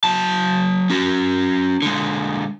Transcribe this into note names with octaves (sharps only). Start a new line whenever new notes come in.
F#3 A5
C#4 F#4
D3 G#3